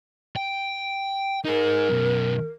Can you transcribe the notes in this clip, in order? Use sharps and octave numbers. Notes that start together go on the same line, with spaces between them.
G5
D#4 G#4 A#4
F#2 B2